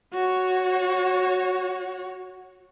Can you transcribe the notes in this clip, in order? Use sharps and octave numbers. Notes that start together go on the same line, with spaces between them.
F#4 C#5